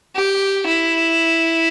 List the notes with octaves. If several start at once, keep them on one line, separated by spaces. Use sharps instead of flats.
G4
E4